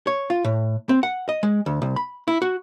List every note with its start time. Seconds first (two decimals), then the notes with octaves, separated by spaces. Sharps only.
0.07 C#5
0.30 F4
0.45 A2
0.89 C4
1.03 F#5
1.29 D#5
1.43 G#3
1.66 D2
1.82 C2
1.96 B5
2.28 E4
2.42 F#4